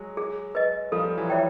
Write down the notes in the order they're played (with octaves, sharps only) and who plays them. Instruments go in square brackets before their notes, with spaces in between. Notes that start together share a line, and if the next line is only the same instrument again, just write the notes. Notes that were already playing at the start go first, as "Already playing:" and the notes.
Already playing: [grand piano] F#3 G#3
[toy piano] G#4
B4 D#5
[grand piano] F3 G3 [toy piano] A4
[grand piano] E3 F#3
[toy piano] C#5 E5 G5